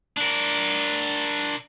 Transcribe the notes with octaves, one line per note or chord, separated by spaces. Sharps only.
D4 A#4